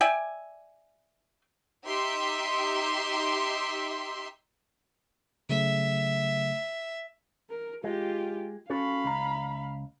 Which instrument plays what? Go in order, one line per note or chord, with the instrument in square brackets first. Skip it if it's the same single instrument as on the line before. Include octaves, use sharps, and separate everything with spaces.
[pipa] D5 E5 G5 G#5
[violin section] D#4 G4 E5 C6
[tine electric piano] C#3 F#3 A3 [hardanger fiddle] E5
[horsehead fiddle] A#4
[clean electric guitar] G#3 [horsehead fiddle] F4 G4
[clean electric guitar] C#4 F#4 A4 [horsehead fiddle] F5 B5
[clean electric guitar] C#2 A#5